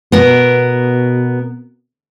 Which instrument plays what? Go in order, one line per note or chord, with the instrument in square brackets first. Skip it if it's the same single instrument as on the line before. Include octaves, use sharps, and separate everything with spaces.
[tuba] B2 [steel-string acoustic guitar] B3 A#4